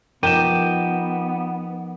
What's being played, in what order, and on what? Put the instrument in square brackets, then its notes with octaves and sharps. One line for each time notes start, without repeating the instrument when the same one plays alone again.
[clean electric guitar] F3 D#4 A#4 [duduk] B3 [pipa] G4 [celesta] D#7 E7